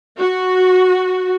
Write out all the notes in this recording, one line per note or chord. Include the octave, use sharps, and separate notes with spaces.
F#4